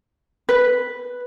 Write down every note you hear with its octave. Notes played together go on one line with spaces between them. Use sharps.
B4